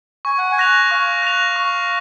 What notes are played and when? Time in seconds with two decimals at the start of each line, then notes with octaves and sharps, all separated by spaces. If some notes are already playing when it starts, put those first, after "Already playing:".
0.25 G#5 C#6
0.38 F#5
0.52 G#5
0.58 F#6 A#6 F7
0.91 F5 C#6
1.22 F#6 A#6 F7
1.56 C#6